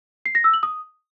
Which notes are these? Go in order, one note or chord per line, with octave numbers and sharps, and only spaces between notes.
C7
A#6
E6
F#7
D#6